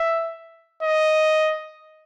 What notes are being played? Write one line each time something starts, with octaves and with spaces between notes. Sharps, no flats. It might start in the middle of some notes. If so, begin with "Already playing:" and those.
Already playing: E5
D#5